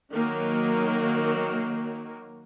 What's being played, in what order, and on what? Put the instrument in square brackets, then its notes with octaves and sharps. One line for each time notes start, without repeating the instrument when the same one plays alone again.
[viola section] D#3 F#3 A#3